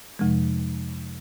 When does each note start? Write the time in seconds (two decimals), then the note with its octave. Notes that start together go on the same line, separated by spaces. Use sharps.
0.19 F2 C3 F3 G#3